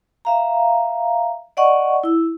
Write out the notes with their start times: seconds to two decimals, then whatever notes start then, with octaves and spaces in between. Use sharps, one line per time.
0.25 E5 F5 A#5
1.57 D5 D#5 F#5 C#6
2.04 E4 E6